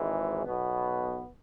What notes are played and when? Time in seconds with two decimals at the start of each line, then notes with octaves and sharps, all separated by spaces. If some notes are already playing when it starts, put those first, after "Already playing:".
Already playing: G#1 G#2 E3
0.44 B1 B2 B3